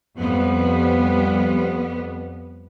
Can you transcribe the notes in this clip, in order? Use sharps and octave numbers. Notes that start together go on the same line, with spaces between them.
F2 G3 B3